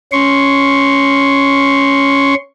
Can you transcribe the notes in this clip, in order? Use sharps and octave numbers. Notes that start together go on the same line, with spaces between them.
C#4 C6 C#6